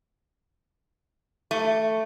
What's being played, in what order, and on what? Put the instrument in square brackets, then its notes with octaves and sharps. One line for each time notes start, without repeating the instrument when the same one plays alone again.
[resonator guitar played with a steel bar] A3